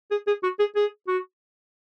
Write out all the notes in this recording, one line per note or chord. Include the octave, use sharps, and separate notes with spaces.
G#4
G#4
F#4
G#4
G#4
F#4